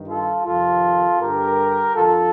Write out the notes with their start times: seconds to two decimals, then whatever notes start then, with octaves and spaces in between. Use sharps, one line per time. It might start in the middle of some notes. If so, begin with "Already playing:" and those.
Already playing: G2 D#3
0.09 F4 A4
0.46 F2 C3 D#3 F4 A4
1.21 G2 D3 G4 A#4
1.96 F2 D3 F4 A4